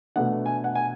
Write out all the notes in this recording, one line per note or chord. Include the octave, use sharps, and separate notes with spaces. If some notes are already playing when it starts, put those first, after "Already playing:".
B2 A3 D4 F#5
G#5
F#5
G#5